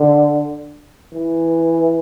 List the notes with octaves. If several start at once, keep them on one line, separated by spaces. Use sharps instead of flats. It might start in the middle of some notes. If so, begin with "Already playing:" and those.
Already playing: D3
E3